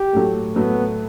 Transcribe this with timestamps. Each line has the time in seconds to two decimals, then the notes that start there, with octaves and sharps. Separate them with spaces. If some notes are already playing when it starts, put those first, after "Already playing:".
Already playing: G4
0.13 A2 F#3 A3
0.56 A2 F#3 A3 B3